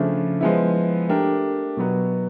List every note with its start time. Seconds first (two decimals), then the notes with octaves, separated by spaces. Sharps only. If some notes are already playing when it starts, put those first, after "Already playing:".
Already playing: C#3 F3 A3 D4
0.41 F3 G#3 B3 E4
1.08 A3 D4 G4 A#4
1.77 B2 F#3 B3